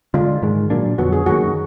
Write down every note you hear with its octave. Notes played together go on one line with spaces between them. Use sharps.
D3 G#3 D4 F4
G#2 D#3 G#3
A#2 F#3 A#3 D4
F2 D3 F#3 B3 F#4
G#4
F#2 D#3 A#3 F#4